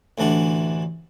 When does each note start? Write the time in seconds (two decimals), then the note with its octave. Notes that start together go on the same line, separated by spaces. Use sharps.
0.18 A1 D2 E3 D4 F#5